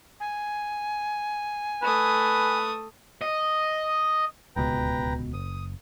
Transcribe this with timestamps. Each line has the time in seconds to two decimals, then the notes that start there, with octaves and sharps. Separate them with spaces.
0.20 G#5
1.82 A3 B4 D#6
3.21 D#5
4.56 D1 C#2 B2 B4 G5 A#5
5.33 F#1 D#6